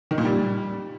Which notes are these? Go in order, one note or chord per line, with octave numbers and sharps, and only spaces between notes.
D#3
A#2
G3